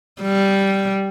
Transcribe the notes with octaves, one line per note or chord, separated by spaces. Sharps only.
G3